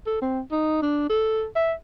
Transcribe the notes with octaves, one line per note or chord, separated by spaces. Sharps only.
A4
C4
D#4
D4
A4
E5